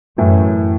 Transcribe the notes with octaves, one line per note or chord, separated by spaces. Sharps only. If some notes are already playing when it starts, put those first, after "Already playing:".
F#2 A2 E3 A3